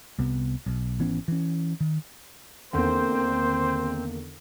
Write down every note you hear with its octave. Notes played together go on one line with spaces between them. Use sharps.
C2 C3 B3
B1
G#1 E3 B3 C#4
E3 C#4
D#3
E2 D3 D#3 A#3 C4 C5